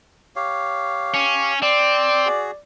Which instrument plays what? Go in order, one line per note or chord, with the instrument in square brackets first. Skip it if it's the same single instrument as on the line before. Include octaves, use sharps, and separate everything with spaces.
[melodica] G4 C#5 F5
[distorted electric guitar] C#4
[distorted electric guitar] C4 [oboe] D5
[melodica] F#4 G#4